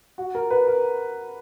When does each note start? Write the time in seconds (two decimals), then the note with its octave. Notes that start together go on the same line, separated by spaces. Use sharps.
0.18 F#4
0.35 A#4
0.51 B4
0.67 A#4